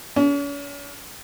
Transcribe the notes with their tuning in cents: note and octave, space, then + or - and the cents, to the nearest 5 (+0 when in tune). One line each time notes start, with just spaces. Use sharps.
C#4 +40